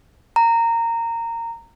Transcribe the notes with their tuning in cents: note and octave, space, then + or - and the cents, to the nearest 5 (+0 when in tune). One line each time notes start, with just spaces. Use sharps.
A#5 -15